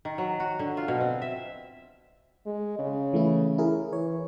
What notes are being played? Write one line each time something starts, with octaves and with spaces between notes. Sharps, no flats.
D#3
F#3
F#4
D3
F4
B2
C4
E5
G#3
C#3
E3 A3 E4
E4 G#4 A#4
E3 C#5